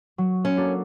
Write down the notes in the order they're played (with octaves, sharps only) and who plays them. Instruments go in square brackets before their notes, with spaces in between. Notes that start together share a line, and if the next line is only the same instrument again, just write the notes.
[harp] F#3
[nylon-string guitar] C#4
[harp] A#3 D4 F#4 A4